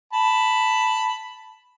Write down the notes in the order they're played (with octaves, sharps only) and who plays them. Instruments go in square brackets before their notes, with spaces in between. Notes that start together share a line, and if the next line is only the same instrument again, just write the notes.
[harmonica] A5 B5